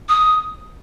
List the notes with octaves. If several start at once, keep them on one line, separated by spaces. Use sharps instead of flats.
D#6